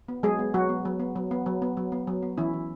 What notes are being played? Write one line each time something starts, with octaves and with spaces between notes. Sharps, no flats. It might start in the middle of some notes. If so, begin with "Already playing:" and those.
B3
F#3 G#3 G#4
B3
F#3 F#4
B3
F#3
B3
F#3
B3
F#3
B3
F#3
B3
F#3
B3
E3 C#4 E4
E3